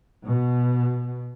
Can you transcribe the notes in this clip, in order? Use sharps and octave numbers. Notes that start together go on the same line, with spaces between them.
B2